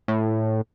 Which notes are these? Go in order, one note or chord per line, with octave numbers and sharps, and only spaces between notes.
A2